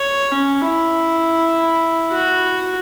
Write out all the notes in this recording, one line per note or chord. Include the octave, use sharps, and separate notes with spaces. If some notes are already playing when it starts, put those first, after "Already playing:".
Already playing: C#5
C#4
E4
F#4